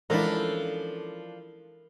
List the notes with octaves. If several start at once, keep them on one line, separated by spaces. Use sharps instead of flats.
E3 F3 G#3 C#4 D4 E4 A4 A#4